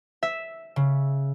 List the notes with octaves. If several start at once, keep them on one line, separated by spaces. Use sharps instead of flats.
E5
C#3